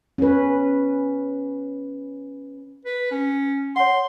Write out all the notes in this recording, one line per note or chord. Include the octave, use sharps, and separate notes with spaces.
C#4 B4
B4
C#4
C#5 F#5 C6